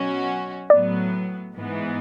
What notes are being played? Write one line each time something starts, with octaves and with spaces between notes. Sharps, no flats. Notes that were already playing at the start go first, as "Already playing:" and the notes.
Already playing: B2 F#3 C#4 F#4
A2 F#3 B3 D5
G#2 E3 B3